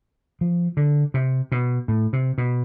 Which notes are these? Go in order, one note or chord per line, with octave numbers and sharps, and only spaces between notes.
F3
D3
C3
B2
A2
C3
B2